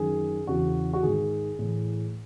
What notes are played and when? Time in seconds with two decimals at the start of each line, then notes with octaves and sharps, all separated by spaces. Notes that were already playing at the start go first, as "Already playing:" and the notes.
Already playing: F#2 D#3 G#4
0.47 E2 C#3 E3 F#4
0.94 F#4
1.03 G#2 D#3 G#4
1.59 A2 E3